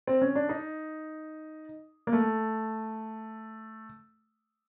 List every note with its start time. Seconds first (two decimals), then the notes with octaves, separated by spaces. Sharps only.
0.07 C4
0.22 C#4
0.35 D4
0.49 D#4
2.07 A#3
2.13 A3